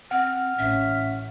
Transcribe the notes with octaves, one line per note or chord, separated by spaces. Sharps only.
C4 F#5 F6
A1 C#4 E5